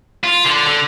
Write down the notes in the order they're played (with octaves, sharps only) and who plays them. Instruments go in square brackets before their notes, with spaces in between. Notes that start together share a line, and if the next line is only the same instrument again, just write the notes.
[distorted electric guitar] F4
D3
D3